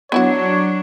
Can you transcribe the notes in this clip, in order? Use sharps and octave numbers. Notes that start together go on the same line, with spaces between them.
F#3 B3 D4 E4 F#4 C#5